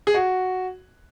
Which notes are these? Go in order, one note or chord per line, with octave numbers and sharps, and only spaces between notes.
G#4
F#4